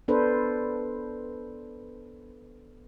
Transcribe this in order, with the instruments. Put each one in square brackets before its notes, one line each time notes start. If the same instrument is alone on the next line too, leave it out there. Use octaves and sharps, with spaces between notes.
[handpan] B3 D4 A4 B4 C5